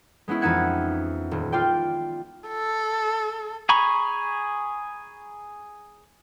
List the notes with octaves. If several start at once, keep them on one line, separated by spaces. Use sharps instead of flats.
G#3 B3 C#4 E4
F2 E3 D#4 E5 F#5 G#6
D#1
F4 D5 G5
A4
G#4 A#5 B5 C#6